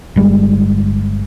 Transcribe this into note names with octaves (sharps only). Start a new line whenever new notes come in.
G1 G3 G#3